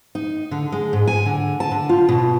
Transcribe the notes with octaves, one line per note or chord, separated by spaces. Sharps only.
D#4
D3
G#3
G#2
G#5
D3
A5
D3
F4
B2